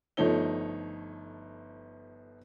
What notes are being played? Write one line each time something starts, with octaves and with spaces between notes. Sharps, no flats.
G1 F3 A3 D#4 C#5 G7